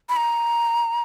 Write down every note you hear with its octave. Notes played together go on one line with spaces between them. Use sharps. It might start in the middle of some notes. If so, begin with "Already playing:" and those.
B5
A#5